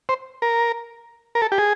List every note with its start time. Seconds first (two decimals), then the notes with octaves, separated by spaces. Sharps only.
0.09 C5
0.42 A#4
1.35 A#4
1.42 A4
1.52 G4
1.58 G#4